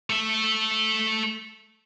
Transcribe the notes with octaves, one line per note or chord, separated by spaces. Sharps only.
A3 E5